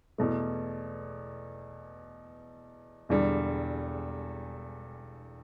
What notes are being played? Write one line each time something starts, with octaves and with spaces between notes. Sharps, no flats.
E2 B2 A3
E1 E2 D3 G3